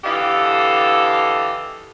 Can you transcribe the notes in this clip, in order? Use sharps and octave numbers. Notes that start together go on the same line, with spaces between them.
D3 E3 G4 A4 D#5 F5